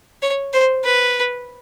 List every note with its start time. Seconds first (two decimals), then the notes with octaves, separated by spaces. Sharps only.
0.22 C#5
0.53 C5
0.84 B4